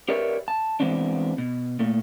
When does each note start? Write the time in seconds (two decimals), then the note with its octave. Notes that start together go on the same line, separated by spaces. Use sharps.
0.09 G4 A#4 B4 C#5 D5 E5
0.48 A5
0.80 E3 G#3 B3 C4 D4
1.38 B2
1.79 A#2 A3